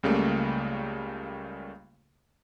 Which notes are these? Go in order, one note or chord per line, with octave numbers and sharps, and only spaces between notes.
C#2 C#3 G3 A3 A#3